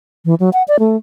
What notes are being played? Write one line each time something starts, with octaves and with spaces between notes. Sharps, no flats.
E3
F#3
F#5
D5
A3